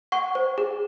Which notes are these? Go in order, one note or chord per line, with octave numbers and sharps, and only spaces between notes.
F#5 C#6
C5
G#4